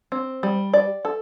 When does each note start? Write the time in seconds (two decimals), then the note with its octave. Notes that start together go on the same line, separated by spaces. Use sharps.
0.12 C4
0.43 G3
0.74 D5
1.05 A4